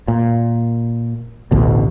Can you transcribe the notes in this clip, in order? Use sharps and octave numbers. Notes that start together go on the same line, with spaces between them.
A#2
A1 D2 B2